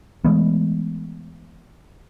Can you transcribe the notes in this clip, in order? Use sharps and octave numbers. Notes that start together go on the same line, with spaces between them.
E3 G#3 A3 B3